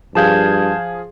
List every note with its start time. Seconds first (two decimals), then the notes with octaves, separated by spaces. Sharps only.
0.15 G2 F3 G#4 F5 A5 G6 G#6